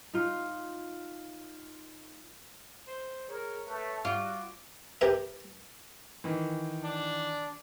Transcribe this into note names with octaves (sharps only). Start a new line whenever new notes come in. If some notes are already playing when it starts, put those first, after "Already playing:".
D#4 F4
C5
G#4 A#4 C#5
A3 B4
G3 F4 F#4 D6
G4 A#4 B4 E5
D#3 E3
D4